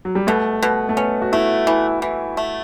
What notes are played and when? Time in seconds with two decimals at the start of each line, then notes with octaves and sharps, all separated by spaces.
0.05 F#3
0.15 G3
0.27 B2 A3
0.63 B2
0.89 A3
0.97 B3 C#4
1.22 F#4
1.32 A3 E4
1.67 E3
2.02 E3
2.37 A3